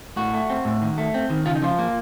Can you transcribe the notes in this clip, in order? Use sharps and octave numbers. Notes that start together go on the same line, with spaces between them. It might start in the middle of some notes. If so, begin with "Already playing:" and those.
A2 F#4
A3
C4
A2
D#3
A3
C4
D#3
C#3 F4
D#4
F3 F4
A#3